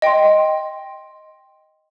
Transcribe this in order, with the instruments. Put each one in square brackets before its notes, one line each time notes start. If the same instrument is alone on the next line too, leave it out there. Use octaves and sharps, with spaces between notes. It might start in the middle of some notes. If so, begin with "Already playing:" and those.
[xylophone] D#5 G5 C6